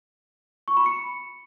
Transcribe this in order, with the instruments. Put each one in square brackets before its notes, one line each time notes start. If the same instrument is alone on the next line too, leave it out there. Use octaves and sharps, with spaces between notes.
[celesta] C#6
B5
C#7